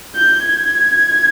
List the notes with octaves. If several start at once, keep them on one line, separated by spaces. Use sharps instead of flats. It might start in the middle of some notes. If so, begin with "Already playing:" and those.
G6
G#6